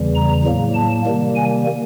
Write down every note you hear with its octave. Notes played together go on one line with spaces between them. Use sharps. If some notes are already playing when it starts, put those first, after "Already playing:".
Already playing: E2 C#3 E3 G3
A#5
A2 F#3 A#3
A5
C3 D#3 G3 A#3
G#5